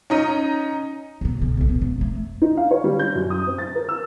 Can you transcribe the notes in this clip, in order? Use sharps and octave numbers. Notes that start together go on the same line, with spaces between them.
C#4 D#4 D#7
D#2 B2
B1 C#3
B1 A2
B2
E1
F2 A3
D#4
F5
C#5
G3
G6
F#2
D#6
C4
A6
A#4
E6